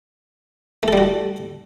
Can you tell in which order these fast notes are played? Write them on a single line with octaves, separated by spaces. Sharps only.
A3 A4 G3 F#4